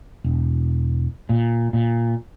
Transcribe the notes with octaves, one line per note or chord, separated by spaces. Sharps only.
E1
A#2
A#2